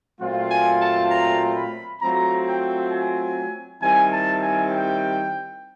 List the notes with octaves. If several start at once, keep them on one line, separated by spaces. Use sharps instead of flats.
A#2 F#3 A3 C4 F4
G#5
A5
A#5
B5
F#3 A3 C4 F4 A#5
G5
G#5
D#3 G3 C4 E4 G#5
A5
G#5
G5